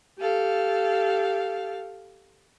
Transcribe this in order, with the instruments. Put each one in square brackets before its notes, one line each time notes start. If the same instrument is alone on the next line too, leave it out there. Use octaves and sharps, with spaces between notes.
[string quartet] G4 A4 F5